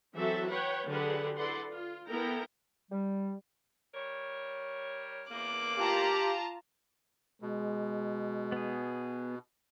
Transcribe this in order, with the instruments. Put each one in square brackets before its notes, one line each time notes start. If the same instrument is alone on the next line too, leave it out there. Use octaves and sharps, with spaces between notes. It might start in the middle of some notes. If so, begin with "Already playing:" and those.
[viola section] E3 F#3 C4 F#4 A4 E5
B4 C#5 F#5 G5
D3 F#3 G4 G#4 B4 F#5
E4 A4 B4 D5 F#5 C6
F4
B3 E4 A4 A#4 G5 A#5
[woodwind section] G3
[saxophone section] G3 A#4 C#5
[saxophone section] E2 A#3 [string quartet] D6 F#6
[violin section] F4 A5 A#5 [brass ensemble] G4
[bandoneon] B2 [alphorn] G#3
[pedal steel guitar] B3 G#4